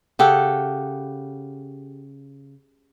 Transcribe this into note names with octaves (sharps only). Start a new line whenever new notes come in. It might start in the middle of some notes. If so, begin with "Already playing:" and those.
C#3 G4 A4 F#5